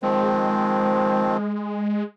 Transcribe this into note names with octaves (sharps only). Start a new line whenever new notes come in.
D#3 F3 G#3 C4